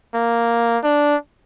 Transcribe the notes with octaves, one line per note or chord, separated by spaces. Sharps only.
A#3
D4